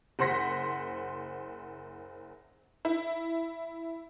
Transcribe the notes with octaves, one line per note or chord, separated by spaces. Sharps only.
F#1 C5 F#5 C6 A#6 B6
E4